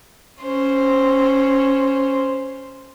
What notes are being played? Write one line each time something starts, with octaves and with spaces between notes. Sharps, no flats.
C#4 C5